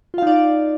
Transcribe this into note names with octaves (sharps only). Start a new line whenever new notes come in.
D#4 F4 D5 F5